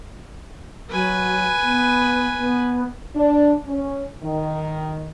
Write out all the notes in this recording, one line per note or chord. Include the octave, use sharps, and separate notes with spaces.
F#3 B4 G#5
B3
B3
D4
C#4
D#3